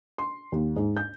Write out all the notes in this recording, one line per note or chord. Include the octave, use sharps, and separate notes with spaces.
C6
D#2
G#2
G6